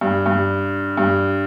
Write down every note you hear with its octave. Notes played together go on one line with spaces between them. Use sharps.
G2
G2
G2